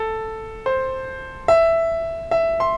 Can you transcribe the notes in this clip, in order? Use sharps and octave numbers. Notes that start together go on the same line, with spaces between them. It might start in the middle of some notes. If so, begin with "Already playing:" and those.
Already playing: A4
C5
E5
E5
C6